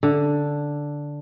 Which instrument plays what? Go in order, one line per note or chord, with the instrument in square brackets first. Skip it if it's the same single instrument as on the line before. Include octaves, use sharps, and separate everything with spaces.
[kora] D3